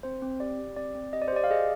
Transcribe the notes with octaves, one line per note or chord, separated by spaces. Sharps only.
C4 C5
C4
G4 D5
G4
C4 D5
C4
G4 D#5
D5
C5
G4 D5
F5
G#4 D#5